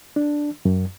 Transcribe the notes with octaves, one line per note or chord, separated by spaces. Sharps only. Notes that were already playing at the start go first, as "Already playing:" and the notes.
D4
F#2